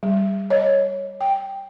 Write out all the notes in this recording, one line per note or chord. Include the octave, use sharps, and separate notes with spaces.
G3
C#5 D#5
G5